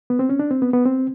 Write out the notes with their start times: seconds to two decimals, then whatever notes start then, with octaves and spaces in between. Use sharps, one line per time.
0.10 B3
0.19 C4
0.29 C#4
0.39 D4
0.51 C4
0.62 B3
0.73 B3
0.85 C4